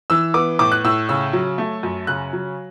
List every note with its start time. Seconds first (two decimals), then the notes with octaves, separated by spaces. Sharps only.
0.10 E3 E6
0.34 B3 D6
0.59 A2 D6
0.72 F#6
0.84 A2 E6
1.09 C#3 E6
1.33 F#3
1.58 A3
1.83 F#2
2.07 C#3 F#6
2.33 F#3